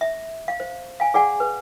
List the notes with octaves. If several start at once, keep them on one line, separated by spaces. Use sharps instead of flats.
E5
F5
C5
F5 G#5
G#4 D5 F#5 G#5
B4